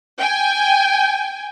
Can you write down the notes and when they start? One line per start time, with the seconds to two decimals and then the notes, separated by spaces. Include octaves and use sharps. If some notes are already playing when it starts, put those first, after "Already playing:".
0.18 G5 G#5